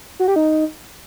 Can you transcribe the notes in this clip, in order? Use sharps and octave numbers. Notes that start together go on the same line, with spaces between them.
F#4
G4
D#4